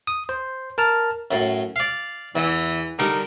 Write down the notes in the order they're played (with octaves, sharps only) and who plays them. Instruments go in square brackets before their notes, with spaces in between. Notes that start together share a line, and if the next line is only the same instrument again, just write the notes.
[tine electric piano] D#6
C5
A#4 A5 F6
[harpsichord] F#2 A2
D5 F5
[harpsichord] E2 [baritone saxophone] E3
[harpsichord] D3 G3 A#4 [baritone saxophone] D#4